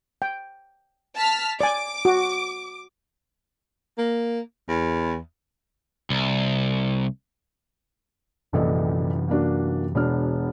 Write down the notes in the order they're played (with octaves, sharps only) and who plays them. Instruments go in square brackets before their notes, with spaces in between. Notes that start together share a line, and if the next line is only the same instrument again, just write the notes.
[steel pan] G5
[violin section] A5 F6 B6
[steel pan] D5 G#5 [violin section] D6
[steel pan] F#4
[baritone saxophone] A#3
E2
[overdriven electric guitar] C2
[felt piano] A#1 A4 D#5 [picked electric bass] F#2 C3 E3
[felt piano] A#3 D4 F#4
[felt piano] E1 D4 F6 [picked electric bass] B2